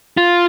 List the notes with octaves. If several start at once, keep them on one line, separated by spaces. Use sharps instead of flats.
F4